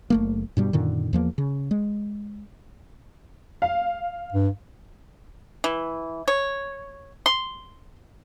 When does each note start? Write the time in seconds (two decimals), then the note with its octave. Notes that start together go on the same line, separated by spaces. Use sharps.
0.10 F#1 A3 A#3
0.57 G2 B2 G3
0.73 F#2 A#2 D3 D#3
1.13 E2 F3 A#3
1.38 C#3
1.71 G#3
3.62 F5
4.32 G2
5.64 E3
6.28 C#5
7.26 C6